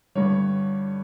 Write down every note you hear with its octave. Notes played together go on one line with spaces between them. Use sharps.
G2 D3 G3 C#5